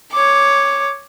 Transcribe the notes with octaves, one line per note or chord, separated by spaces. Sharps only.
C#5 D6